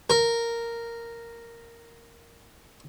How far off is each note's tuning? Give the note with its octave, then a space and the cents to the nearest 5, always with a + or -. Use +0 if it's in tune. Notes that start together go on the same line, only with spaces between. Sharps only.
A#4 -5